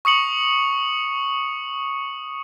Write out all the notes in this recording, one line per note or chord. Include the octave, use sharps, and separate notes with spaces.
C#6 D#6 C#7 F#7